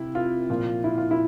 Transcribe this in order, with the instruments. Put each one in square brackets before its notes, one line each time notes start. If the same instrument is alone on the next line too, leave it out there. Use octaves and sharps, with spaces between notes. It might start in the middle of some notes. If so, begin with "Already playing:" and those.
Already playing: [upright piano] C3 E4
F4
A#2 F3
E4
F4
E4